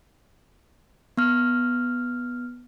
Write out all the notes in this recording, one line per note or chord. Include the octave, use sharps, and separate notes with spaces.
B3 F6